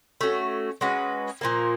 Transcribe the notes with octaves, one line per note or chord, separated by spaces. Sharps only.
A3 C#4 F#4
G#3 C#4 F#4 B4
A#2 F3 A#3